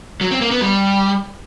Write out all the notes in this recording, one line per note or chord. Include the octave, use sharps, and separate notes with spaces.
F#3
C4
A#3
B3
G3